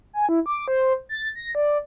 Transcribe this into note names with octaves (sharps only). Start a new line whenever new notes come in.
G#5
E4
D6
C5
A6
A#6
D5